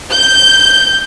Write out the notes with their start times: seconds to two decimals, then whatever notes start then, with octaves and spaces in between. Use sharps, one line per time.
0.11 G6